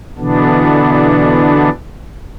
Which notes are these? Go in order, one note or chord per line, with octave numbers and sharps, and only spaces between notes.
B2 D3 E3 B3 D4